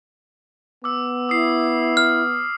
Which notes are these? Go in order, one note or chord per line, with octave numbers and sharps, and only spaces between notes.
B3 D6 E6
E4 D#6 C7
F6